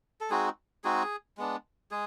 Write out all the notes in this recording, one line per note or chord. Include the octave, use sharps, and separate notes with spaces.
A4
G#3 C4 D#4 F#4 G#4
G#3 C4 D#4 F#4 G#4
G#3 B3 D4
G#3 G#4